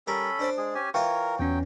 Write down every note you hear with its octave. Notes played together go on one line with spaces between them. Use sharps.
G3 C#4 A4 A#4 B5
D4 C5 D5
G#3 G#4
C#4 G4 G#5
E3 F4 A#4 C#5 F5 G5 C#6
E2 F#3 C#4 G5